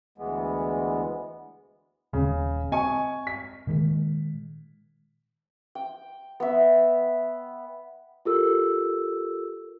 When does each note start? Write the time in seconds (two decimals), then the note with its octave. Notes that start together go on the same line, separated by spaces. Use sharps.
0.18 D2 E3 G#3 B3
2.13 D#1 C#3
2.72 C4 D#5 G#5 C#6
3.27 B6
3.67 A#2 D#3 G#3
5.75 G5
6.40 B3 E5
8.25 F4 G4 A4 A#4 E6